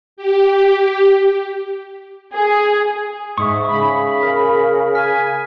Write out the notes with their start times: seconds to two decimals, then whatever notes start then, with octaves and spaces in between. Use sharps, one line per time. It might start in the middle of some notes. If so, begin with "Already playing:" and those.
0.17 G4
2.33 G#4
3.38 G#2 E5 C#6 D#6
3.67 C#3 B5
4.23 A#4
4.95 G#5 F6 B6